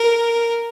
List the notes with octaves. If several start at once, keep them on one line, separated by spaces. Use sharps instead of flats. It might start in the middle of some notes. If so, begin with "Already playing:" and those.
Already playing: A#4